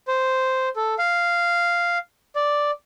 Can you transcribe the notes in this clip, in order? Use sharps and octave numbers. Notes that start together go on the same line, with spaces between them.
C5
A4
F5
D5